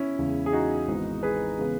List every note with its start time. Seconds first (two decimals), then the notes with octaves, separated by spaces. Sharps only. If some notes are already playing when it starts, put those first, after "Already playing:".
Already playing: C#4 E4
0.19 E2 C#3 G#3
0.46 G#4
0.53 D#4 F#4
0.88 G#1 G#2 E3 B3
1.23 G#4 B4
1.58 C#3 E3 G#3 B3